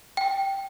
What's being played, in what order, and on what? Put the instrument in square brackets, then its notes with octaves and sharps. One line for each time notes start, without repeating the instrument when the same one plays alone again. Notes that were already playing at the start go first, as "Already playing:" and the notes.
[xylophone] G5